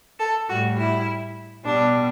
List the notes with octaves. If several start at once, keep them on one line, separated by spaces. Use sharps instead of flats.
A4
A2 G3 F#4
E4
B2 G3 D4